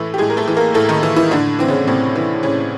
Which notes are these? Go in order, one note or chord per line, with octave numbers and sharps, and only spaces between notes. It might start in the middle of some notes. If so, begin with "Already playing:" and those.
Already playing: A2 E3 A3 A4
G4
A2 G#3 G#4
A#4
A3 A4
E3
A#3 A#4
A2 A3 A4
D#3 D#4
E3 E4
E3 E4
A2 D3 D4
E3 C4
C#3 C#4
A2 C3 C4
E3
A2 C#3 C#4